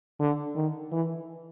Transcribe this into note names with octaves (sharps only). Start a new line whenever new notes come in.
D3
D#3
E3